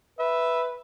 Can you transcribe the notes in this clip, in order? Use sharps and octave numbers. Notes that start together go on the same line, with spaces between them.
B4 E5